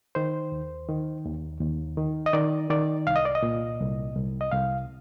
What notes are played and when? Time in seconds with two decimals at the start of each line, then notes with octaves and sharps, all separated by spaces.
0.15 D#3 C5
0.52 D#2
0.89 D#3
1.25 D#2
1.61 D#2
1.97 D#3
2.26 D#5
2.33 D#3 D5
2.70 D#3 D5
3.07 C2 F5
3.16 D#5
3.25 D5
3.35 D#5
3.43 A#2
3.80 C2
4.16 C2
4.41 D#5
4.51 C2 F5